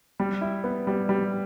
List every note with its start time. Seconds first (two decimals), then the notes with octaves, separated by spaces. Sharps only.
0.20 G3
0.41 E4
0.64 B3
0.87 G3
1.09 G3